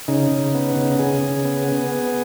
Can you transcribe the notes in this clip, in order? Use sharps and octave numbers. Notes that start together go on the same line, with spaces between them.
C#3 D#4
C#3
B3
C#3
C#3 G#4
C#3
B3
B3
B3